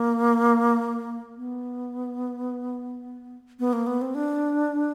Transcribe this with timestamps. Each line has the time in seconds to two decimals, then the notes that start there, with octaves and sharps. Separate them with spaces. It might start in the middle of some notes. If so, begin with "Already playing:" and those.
Already playing: A#3
1.37 B3
3.59 B3
3.73 A#3
3.87 B3
4.01 C4
4.15 D4